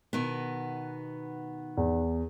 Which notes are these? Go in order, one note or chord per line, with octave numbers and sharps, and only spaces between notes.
B2 D#3 B3
E2